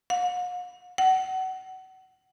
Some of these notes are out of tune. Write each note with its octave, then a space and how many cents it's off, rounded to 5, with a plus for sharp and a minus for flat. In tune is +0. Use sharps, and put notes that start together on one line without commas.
F#5 -45
F#5 +30